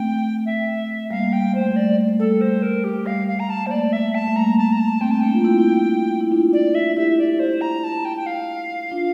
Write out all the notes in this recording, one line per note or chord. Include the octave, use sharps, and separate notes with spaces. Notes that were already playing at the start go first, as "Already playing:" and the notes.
Already playing: A3 C4 G5
E5
G3 A#3 F5
G3 G5
A3 C5
A3
G3 D5
A3
G3 A4
G3 C5
A#4
G4
G3 F5
F5
A#5
A5
A#3
C5
A3 D5
E5
A5
A3
G3 A#3 A#5
A5
A#5
A5
A3 C4 G5
C4 A5
A#3 D4 G5
F4
C4 E4
E4
D4 F4
D5
E5
E4 G4 E5
D5
C5
A#5
A5
G5
G5
F5
D4 F4